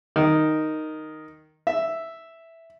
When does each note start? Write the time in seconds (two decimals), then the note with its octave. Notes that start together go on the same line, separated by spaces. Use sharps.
0.16 D#3
1.67 E5